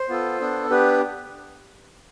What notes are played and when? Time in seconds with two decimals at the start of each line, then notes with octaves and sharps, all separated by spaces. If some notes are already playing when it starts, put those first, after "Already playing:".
Already playing: C5
0.09 B3 F4 A4
0.40 B3 D4 A4
0.70 B3 D4 G4 B4